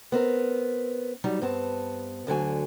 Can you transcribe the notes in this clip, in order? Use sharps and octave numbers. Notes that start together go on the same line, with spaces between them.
B3 C4 A#4
F#3 G3 D#4
G2 B3 C4 A5
D2 D3 F#3 G#5